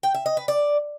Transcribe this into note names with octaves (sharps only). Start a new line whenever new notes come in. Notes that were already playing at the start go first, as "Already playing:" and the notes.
G5
E5
D#5
B4
D5